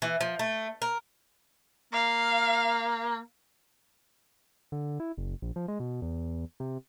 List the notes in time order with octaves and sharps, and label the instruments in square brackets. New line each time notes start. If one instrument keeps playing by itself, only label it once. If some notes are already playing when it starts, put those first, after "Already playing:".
[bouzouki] E3
F3
A3
A#4
[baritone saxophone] A#3 [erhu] F5
[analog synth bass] D3
E4
F#1
A#1
F3
G#3
B2
E2
C3